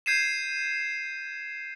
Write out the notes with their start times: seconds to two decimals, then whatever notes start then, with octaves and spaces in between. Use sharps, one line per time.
0.06 G6 G#6 C7 D#7 E7